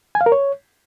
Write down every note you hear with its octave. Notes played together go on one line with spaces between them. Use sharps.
G#5
F5
A#4
C#5